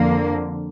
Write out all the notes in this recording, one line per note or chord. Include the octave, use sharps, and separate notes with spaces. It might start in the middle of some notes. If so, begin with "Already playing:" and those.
Already playing: F2 D3 A#3